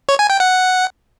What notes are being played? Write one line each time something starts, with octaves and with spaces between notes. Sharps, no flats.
C#5
G#5
G5
F#5